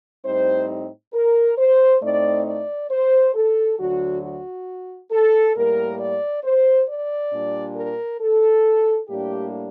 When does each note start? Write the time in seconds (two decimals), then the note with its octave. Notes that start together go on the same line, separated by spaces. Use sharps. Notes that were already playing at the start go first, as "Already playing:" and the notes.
0.25 A2 G3 C4 D#4 C5
1.13 A#4
1.57 C5
2.01 A2 A3 C4 D#4 D5
2.46 D5
2.90 C5
3.35 A4
3.78 D2 D3 F#3 F#4
4.23 F#4
5.11 A4
5.55 A2 G3 A#3 A#4
5.99 D5
6.43 C5
6.88 D5
7.32 A#2 G3 D4
7.76 A#4
8.21 A4
9.08 A2 G3 A#3 D4 G4